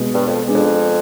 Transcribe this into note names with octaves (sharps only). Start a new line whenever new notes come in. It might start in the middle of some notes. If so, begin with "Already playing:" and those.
Already playing: B2 G#3 B3
G2
F2
G#3 B3 D4 G#4
F2